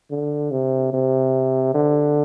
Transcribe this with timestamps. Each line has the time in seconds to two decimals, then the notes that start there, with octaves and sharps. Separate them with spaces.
0.11 D3
0.51 C3
0.93 C3
1.75 D3